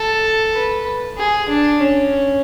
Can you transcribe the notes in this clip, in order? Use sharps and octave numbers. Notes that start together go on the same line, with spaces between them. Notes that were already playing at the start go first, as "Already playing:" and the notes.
Already playing: A4
B4
G#4
D4
C#4